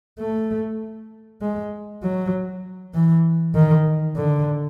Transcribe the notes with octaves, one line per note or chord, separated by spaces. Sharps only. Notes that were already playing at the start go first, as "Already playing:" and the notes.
A3
G#3
F#3
E3
D#3
D3